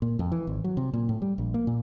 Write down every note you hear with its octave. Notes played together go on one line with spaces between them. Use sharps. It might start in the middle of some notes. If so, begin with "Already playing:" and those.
A#2
F2
E3
G#1
F#3
C3
A#2
A2
G3
A#1
A#3
A#2